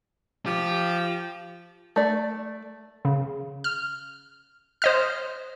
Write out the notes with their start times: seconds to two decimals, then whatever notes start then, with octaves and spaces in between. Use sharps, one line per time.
0.46 F3 G4
1.96 A3 D5
3.05 C#3
3.64 F6
4.82 C5 D#5 F6